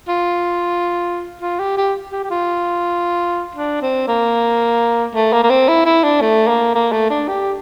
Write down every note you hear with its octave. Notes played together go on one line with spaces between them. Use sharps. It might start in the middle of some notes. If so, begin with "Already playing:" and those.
F4
F4
G4
G4
G4
G4
F4
D4
C4
A#3
A3
A#3
A#3
C4
E4
E4
D4
A3
A#3
A#3
A3
D4
G4